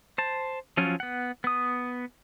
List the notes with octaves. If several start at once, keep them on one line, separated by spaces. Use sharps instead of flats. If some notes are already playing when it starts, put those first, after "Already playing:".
C5 A5
F3 F#3 C#4 F4
B3 F#5
B3 D#6